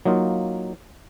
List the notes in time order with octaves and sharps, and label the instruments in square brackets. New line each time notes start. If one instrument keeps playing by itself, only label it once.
[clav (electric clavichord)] F#3 A#3 D#4 F4